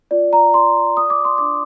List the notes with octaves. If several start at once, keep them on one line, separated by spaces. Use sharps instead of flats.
F4 D5
A#5
F4 C6
D5 D#6
D6
C6
D4 D6